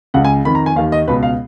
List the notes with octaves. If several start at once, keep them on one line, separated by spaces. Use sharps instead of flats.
C#2 C#3 F#5
G#5
F2 D#3 B5
A#5
G#5
D#2 D#3 F5
D#5
C#2 B2 B4
F5